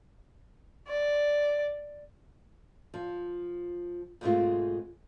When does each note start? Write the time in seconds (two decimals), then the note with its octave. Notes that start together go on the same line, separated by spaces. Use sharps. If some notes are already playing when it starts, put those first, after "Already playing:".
0.89 D5
2.94 F3
4.21 G#2 B2 G#3 A3 C4 F4